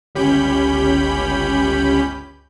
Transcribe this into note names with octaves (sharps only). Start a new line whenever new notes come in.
G1 C#2 C#4 G4 B5 G6